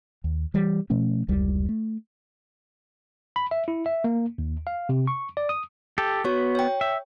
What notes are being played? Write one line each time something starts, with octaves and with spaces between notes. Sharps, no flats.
D#2
E3 G3
B2 F3 A3 C#4
F1 C#2 G3
A3
B5
E5
E4
E5
A#3
D#2
F5
C3
C#6
D5
D#6
G4 A4
B3 F#4 C#5 C#6
C#5 G5
E5